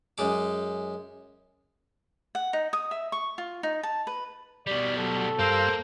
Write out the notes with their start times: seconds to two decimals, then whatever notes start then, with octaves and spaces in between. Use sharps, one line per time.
0.18 F#2 G#3 D6
2.35 F#5
2.53 D#4
2.73 D#6
2.91 E5
3.12 C#6
3.38 F4
3.63 D#4
3.83 A5
4.07 B4
4.67 B2 G3 D5
4.97 F#3 A4
5.39 G2 A#3 C5 F5 E6